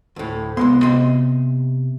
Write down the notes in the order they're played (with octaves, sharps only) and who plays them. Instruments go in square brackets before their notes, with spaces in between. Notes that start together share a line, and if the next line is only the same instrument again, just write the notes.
[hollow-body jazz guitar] D2 A2
[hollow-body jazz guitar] C2 G#3 C6 [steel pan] B3
[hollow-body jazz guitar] C3 D#5 C6